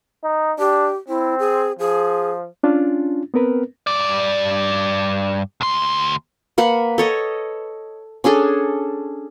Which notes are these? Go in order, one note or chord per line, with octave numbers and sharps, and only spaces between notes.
D#4
D4 G4
C4 E4
G#4
F3 G#4
C#4 D4 F4
B3 C4 A#4 B4
G2 D5
D2 C6
A#3 B4 F#5 B5
A4 C#5 D#5
C#4 D4 G#4 A4